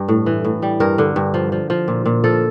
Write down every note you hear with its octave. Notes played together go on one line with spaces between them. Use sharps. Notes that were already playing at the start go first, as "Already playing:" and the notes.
Already playing: G2
A2
E3
A2
G3
G2 A#4
D3
G2
F3
F3
F3
A#2
A#2
F3 A4